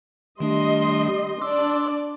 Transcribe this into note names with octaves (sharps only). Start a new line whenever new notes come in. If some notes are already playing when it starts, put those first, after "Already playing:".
D#3 G3 A3 D4 D#5 C6
D4 D5 C6 D6 E6